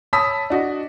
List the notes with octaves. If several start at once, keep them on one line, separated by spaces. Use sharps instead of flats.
C#5 A5 B5 D#6 E6 B6
D4 F#4 D#5